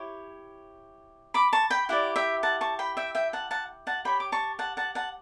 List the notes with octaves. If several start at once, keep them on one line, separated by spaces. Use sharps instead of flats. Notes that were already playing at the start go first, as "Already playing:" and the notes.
Already playing: E4 G4 C#5
B5 D6
A5 C#6
G5 B5
E4 G4 D5 F#5
E5 G5
F#5 A5
A5 C#6
G5 B5
E5 G5
E5 G5
F#5 A5
F#5 A5
F#5 A5
G4 C#5 G5 B5
D6
A5 C#6
F#5 A5
F#5 A5
F#5 A5